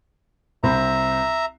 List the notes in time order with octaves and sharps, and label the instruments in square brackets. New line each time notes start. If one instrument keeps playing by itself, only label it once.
[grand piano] C2 C4 B5 [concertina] E5 A#5